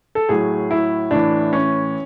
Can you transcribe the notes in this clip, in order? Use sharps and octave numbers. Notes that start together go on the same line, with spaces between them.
A4
A2 F#3 G#4
E4
A2 E3 D4
C#4